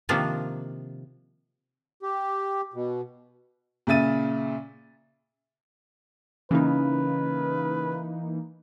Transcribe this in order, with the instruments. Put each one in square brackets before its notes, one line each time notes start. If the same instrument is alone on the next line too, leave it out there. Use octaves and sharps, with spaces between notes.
[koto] C3 D#3 F3 A#3 D4 F4
[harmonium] G4
B2
[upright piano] A#2 C#3 E5 A6 D#7
[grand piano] C#3 [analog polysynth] E3 A#3 D#4 [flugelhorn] B4